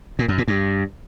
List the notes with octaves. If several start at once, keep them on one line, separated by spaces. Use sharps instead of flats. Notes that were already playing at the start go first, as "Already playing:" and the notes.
A#2
F#2
A#2
G2